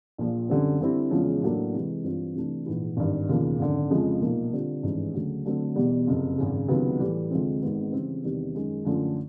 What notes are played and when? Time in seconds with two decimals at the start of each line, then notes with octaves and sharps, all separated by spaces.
0.18 A#1 A#2 F3
0.49 F#2 D3 G3 C4
0.81 D3 G3 C4 E4
1.11 E2 C#3 F3 G#3 C#4
1.42 A2 F#3 A#3 D4
1.74 C3 E3 G#3
2.04 G2 E3 G3 C4 F4
2.35 C3 E3 A3 D4
2.66 A#1 G#2 E3
2.97 G#1 G2 D#3
3.28 E1 D#2 C#3 F3 A#3
3.59 G#1 F#2 D3
3.90 F2 C#3 F3 G#3
4.21 B1 A#2 F3 A#3 D#4
4.52 D3 G3 C4 F4
4.83 G#1 G2 E3 G#3 C#4
5.14 D2 C#3 F#3 A3
5.45 D3 F#3 A3 C4
5.76 E1 E2 B2 G3
6.07 F#1 F2 C3
6.38 G#1 F#2 C#3
6.69 C#2 C3 D#3 F#3 B3
7.00 A2 E3 G3
7.31 D2 C3 F3 G#3 C4
7.62 G#1 G#2 D#3 G#3 B3
7.93 C#3 E3 G3 C4
8.24 E2 C3 D#3 G3 B3
8.55 F#2 D#3 G#3
8.85 F#2 D3 F3 A3